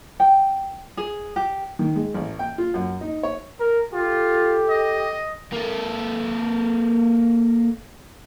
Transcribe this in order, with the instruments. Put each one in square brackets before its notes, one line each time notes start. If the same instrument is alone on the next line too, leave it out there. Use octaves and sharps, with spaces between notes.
[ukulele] G5
G#4
G4
[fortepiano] D#3
G#3
A1
G5
F4
F#2
D#4
C#5
[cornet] A#4
[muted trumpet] F4 [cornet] G4 [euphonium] A4
[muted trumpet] D#5
[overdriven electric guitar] A#3 A4